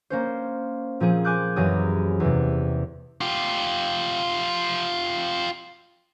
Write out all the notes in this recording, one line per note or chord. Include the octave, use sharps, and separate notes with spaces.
A#3 C#4 C5
A#2 F3 C4 G#4
G#5 C6 D6 F#6 G6
F#2 E3 F#3 G4 G#4 D#6
E2 C3
F4 G4